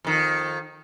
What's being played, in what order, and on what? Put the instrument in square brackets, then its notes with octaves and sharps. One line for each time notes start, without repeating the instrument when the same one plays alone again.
[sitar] F2 D#3